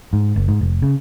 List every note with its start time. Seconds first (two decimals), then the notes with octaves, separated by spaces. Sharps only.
0.13 G#2
0.36 F#1
0.48 G#2
0.61 F1
0.82 C#3